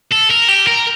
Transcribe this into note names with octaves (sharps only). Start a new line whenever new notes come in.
A4
A#4
G4
A#4